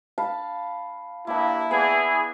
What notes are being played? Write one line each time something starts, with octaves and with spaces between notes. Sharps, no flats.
F5 A5 B5
G2 A#3 E4 A5
E3 B3 G#4 D5